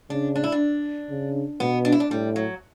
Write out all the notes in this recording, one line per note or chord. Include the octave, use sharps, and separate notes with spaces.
C#3 D4
D4
E4
D4
C#3
B2 B3
D4
E4
D4
A2 G3
F#3